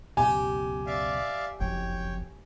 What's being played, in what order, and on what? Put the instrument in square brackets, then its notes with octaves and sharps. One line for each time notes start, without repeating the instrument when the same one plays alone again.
[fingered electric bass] C#2 F#2 B2 [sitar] G4 [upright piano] G#5
[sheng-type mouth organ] D5 E5 F5
[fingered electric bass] F#1 C2 F2 [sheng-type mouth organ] C#5 G5